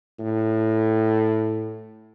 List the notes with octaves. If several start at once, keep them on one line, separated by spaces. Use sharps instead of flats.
A2